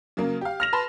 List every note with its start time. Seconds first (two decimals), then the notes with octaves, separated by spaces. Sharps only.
0.17 C#3 F#3 A#3
0.41 G4 F5
0.60 F6 A#6 F7
0.73 B4 A5 B5 C6